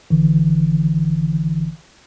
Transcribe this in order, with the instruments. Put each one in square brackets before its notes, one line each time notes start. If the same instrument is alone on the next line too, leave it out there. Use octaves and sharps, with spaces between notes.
[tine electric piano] A1 D3 E3